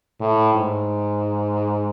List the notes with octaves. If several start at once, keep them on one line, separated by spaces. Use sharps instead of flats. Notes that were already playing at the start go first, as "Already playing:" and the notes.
A2
G#2